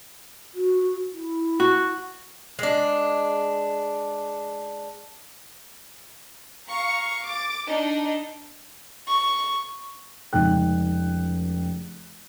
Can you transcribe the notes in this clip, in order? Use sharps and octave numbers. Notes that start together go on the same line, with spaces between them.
F#4
E4
F#4
G#3 D4
F5 A#5 C#6
D6 A6
D4 D#4
C#6
F1 C#2 D#4 G5 F#6